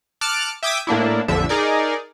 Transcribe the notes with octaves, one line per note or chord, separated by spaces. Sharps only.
A5 D6 F6 F#6 C#7 D7
E5 G5 D6 D#6 G#6 B6
A2 A#3 D4 E4
A#1 F2 D3 E5
D#4 G#4 A#4 D5